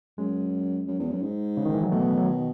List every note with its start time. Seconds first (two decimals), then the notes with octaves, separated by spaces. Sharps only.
0.18 F#2 G#3
0.87 F#2
0.99 E2
1.10 F#2
1.22 G#2
1.57 C#3
1.66 D#3
1.74 E3
1.83 F#3
1.92 B2 A3
2.01 B3
2.18 F#3
2.27 D#3